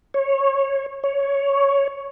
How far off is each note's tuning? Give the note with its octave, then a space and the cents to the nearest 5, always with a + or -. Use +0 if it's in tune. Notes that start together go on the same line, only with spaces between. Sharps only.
C#5 -20
C#5 +5